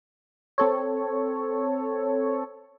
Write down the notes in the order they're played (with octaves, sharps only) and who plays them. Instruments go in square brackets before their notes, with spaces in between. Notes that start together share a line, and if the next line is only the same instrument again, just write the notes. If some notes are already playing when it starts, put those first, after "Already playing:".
[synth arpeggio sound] C4 A4 C#5